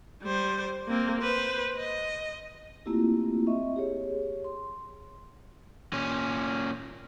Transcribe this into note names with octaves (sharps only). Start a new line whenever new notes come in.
G3 C5
A#3 C4
B4 C5
D#5
A3 A#3 C4 E4 F4 G4
C4 D#5 E5 C#6
G4 G#4 C#5
C6
A#2 C#4